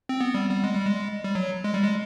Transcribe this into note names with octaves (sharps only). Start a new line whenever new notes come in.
C4
B3
G3
G3
G#3
G3
G#3
G3
F#3
G#3
G3
G#3